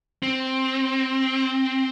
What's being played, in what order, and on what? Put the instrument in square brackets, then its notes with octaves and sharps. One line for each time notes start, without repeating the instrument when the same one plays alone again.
[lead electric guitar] C4